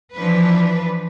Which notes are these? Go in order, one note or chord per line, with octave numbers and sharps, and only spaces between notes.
E3 F3 D4 B4